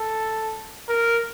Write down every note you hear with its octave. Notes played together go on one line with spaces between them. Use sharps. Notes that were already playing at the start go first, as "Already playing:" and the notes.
Already playing: A4
A#4